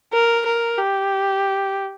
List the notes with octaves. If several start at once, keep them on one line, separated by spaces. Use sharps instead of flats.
A#4
A#4
G4